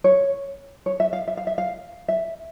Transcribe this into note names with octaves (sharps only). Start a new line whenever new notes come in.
C#5
C#5
E5
F5
E5
F5
E5
F5
E5